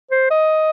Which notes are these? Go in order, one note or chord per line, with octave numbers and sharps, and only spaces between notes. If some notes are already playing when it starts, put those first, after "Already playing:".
C5
D#5